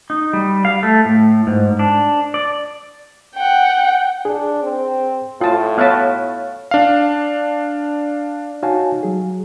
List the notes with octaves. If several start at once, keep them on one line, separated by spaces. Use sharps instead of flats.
D#4
G3
F5
A3
A2
G#2
D4
D5
F#5 G5
D4 G#4
C4
A2 F4 A5
B3 C#5 E5 F5 A5 F#6
D4 F5
D#4 F#4 C#5 F5 G#5 A5
F#3 G#4